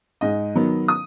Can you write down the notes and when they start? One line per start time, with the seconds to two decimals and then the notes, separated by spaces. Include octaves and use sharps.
0.21 G#2 D#5
0.55 D#3 F#3 B3
0.88 D#6